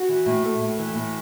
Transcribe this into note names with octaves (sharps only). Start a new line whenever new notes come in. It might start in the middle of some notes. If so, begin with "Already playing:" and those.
Already playing: F#4
E3
A2
A3
A2
E3
A2